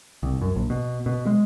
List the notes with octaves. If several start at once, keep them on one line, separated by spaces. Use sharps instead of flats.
C2
F#2
A#1
B2
B2
G#3